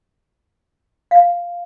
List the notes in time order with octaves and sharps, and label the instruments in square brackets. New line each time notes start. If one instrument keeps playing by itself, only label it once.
[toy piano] F5